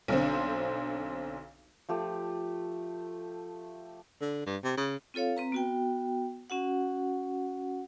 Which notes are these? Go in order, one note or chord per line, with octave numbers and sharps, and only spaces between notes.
B1 D3 C4
F3 A3 G4
D3
G2
C3
C#3
C4 F4 A4 C#5 F5
C4 B4 A#5
B3 F#4 G5
C#4 F#4 F#5